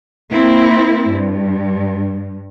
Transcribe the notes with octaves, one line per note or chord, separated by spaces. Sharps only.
A#3 C4 E4
G2